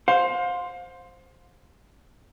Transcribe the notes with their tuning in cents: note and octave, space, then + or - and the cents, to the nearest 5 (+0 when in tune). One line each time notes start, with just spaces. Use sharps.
C5 +0 F5 +35